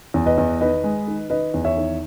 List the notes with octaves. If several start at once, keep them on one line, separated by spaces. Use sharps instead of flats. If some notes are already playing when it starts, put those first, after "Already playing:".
E2
B4 D#5
E2
D#3 B4 D#5
G#3
D#3
D#3 B4 D#5
E2
C#5 E5
D#3